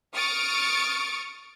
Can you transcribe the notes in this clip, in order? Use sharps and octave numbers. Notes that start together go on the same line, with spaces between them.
C#6 D#6 F6 A6 C#7 D7